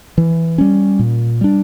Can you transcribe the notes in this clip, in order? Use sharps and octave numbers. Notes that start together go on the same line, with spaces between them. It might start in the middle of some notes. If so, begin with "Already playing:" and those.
E3
G3 C#4
A#2
G3 D4